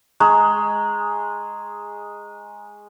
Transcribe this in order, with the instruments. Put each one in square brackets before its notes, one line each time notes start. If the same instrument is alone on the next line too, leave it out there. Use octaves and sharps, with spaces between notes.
[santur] G#3 [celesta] A#5 C#6